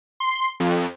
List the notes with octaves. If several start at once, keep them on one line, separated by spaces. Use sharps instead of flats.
C6
F2